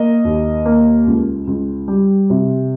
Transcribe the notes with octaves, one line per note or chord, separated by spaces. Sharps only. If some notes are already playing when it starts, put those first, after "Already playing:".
Already playing: A#3 D#5
D#2
A#3
C#2
C#2
G3
C3